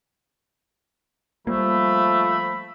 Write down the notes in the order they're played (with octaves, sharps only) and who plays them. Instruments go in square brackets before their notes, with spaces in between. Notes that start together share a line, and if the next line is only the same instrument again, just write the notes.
[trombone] F3 [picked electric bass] G3 A#3 [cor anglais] A3 [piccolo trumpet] B5